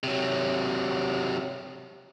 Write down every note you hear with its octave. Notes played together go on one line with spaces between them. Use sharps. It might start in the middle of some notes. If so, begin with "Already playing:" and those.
C3 F#3